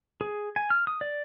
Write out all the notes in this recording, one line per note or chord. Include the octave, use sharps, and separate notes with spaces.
G#4
G#5
F6
D#6
D5